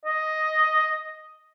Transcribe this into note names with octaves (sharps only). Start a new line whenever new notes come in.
D#5